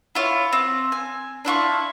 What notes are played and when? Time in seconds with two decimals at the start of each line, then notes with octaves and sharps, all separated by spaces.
0.15 E4 F4 C#5
0.52 C4
0.92 G#5
1.45 D4 E4 F4 C#6